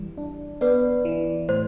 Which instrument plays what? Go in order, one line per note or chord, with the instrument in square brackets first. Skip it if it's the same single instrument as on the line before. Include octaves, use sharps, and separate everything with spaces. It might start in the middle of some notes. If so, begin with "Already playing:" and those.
Already playing: [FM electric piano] E3 G3
D4
[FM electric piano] B3 [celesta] B4 D5
[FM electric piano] E3
[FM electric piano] A2 [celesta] C5